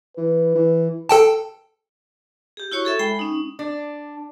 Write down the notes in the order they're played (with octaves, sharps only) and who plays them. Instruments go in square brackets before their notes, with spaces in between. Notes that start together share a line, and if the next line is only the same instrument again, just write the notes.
[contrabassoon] E3 [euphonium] B4
[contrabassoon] E3
[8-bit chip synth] A4 G5 A5
[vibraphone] G4 G#4
E4 F#4 C#5 C#6
G#4 A4 E5
G#3 G5 B5
C#4 D#4
[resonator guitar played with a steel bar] D4